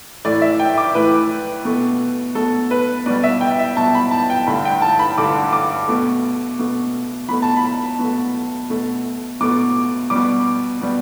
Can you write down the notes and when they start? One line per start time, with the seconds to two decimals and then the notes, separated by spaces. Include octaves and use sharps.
0.25 A2 E3 A3 D5
0.42 E5
0.60 G5
0.78 D6
0.95 A2 E3 A3 B4
1.65 B2 A3
2.35 B2 A3 A4
2.71 B4
3.06 B2 G3 D5
3.24 E5
3.41 G5
3.59 E5
3.77 B2 G3 A5
3.95 B5
4.11 A5
4.30 G5
4.47 G2 D3 A3 B5
4.65 G5
4.82 A5
4.99 B5
5.18 G2 D3 A3 D6
5.53 D6
5.88 B2 A3
6.59 B2 A3
7.29 B2 A3 B5
7.42 A5
7.56 B5
7.99 B2 A3
8.70 B2 A3
9.41 B2 A3 D6
10.10 B2 G3 D6
10.82 B2 G3